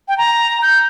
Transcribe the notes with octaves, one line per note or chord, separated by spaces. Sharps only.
G5
A#5
G6